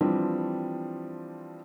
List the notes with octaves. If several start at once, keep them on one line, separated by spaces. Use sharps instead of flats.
E3 F3 G3 C4 D4